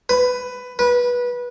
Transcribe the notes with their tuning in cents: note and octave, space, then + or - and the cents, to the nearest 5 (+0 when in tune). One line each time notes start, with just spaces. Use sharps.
B4 +15
B4 -20